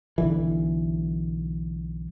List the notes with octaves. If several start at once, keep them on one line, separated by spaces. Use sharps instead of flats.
B1 D3 E3